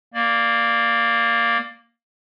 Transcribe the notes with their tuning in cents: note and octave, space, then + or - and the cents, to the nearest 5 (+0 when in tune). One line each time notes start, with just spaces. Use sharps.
A#3 +0 D5 +15